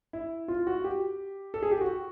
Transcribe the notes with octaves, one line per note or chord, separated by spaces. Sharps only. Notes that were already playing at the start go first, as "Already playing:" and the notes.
E4
F4
F#4
G4
A4
G#4
G4
F#4